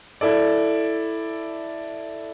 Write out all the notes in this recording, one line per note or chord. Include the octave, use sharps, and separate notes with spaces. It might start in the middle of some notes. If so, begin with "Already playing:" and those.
E4 A4 D5